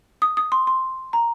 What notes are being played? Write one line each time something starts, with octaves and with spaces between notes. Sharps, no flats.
D#6
D#6
C6
C6
A#5